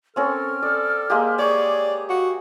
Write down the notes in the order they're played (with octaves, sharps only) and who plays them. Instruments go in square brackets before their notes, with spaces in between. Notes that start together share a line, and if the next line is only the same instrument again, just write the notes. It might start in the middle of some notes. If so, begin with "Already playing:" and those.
[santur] C4 C#4 A#4 [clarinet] A4 [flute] F6
[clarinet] A4 [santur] D5
[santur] G#3 A#3 G4
[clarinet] G#4 [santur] C#5 [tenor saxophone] D5
[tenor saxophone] F#4 [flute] F5